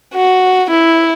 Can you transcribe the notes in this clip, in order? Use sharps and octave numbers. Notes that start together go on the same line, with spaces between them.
F#4
E4